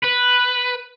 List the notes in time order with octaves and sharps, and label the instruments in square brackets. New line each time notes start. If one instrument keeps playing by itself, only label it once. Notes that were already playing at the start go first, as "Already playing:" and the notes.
[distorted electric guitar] B4